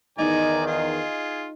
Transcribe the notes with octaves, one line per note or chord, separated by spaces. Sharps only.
E2 D#3 D#4 D5 G#5 A#5
F4 G#4